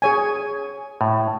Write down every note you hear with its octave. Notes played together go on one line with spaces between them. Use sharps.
G#4 C#5 G#5
A2